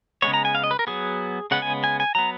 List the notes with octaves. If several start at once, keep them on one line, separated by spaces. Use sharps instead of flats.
C#3 G#3 B3 C#5
A#5
G#5
F5
D#5
B4
A#4
F#3 B3 G#4
C#3 G#3 B3 F#5
G#5
G#5
G#5
F#3 B3 A#5